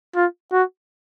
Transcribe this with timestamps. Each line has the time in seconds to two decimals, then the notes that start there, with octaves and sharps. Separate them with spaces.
0.15 F4
0.52 F#4